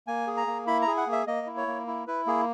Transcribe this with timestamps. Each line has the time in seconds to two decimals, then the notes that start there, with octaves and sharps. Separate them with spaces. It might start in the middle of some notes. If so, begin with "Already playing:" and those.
0.07 A#3 G#5
0.27 G#4
0.37 A#5
0.47 A#3
0.67 E4 B5
0.82 A#5
0.87 G#4
0.97 F#5
1.07 A#3
1.12 E5
1.27 A#3 D#5
1.47 E4
1.57 C#5
1.67 A#3
1.87 E4
2.07 E4 B4
2.27 A#3 G#4